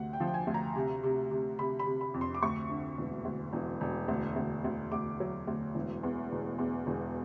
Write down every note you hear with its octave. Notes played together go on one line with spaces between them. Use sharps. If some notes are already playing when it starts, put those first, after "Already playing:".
Already playing: D2 C3 F#5
G5
F3
G5
G#5
D2
A#5
C3
C3
C3
C3 B5
B5
C3
B5
F2
C6
D6
D2 C#6
D3
E1
D2
E1
E1
D2
D2
D2
D2 D6
F#3
D2
E1
E2
E1
E2
E1